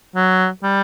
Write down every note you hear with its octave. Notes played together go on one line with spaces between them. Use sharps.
F#3
G3